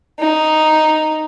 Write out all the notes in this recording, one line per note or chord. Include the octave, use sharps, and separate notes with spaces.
D#4